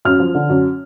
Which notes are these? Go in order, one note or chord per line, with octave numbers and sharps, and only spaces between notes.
F#2 F6
F3
D3
F#2